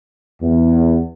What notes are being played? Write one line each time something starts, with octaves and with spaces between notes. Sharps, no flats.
E2